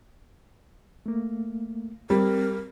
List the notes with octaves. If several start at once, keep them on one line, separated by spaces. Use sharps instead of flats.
A3 A#3
G3 C4 A#4